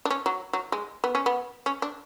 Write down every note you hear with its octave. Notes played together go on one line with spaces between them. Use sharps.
D4
C#4
F#3
F#3
G#3
B3
C#4
B3
C#4
D4